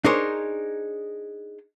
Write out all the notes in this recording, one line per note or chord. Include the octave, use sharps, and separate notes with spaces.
D4 D#4 G#4 A#4 C5 C#5